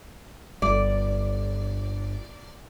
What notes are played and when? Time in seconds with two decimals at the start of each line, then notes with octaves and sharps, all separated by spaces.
0.62 G1 G3 D5